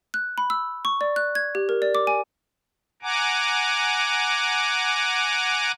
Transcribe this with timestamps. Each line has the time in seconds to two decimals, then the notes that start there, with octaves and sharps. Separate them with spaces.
0.14 F#6
0.38 B5
0.50 E6
0.85 C#6
1.01 D5
1.16 F#6
1.35 G#6
1.55 G4
1.69 A#4
1.82 D5
1.95 D6
2.07 G#5
3.02 F#5 G#5 A#5 D6